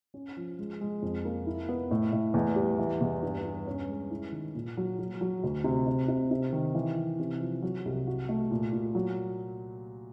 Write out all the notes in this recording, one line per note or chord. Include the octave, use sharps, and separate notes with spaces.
C#4
F3
G#3
G#3
F2
A#3
E4
B3
A2
A2
E2
G3
E3
E2
G2
G2
C#4
G#3
E4
D#3
A#2
F#3
F#3
F#3
D2
C3
C3
C3
C3
D#3
E3
E3
C3
F3
F#3
C2
F#4
A3
A#2
A#2
F#3